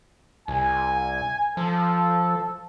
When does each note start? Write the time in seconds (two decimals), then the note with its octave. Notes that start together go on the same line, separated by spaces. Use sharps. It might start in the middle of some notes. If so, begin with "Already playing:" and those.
0.48 C2 G#5
1.57 F3 A4